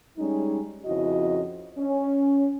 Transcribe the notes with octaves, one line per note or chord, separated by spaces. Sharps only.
G3 G#3 C#4 D#4
F2 C#3 C#4 E4 F#4 D#5
C#4